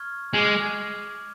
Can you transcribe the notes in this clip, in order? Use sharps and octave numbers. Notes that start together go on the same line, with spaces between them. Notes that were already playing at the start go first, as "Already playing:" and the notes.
Already playing: C#6 F6 G#6
G#3 D6 F6 G#6